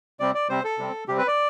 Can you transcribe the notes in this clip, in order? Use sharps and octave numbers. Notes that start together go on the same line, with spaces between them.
C3 G3 C4 D5
D5
C3 G3 C4 C5
A4
C3 G3 C4
C3 G3 C4 G4
B4
D5